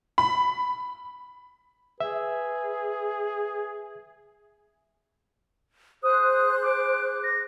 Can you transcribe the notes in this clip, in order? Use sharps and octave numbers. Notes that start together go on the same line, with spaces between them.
B5
G#4 B4 E5
G#4 C5 D#6 F#6
D6
A#6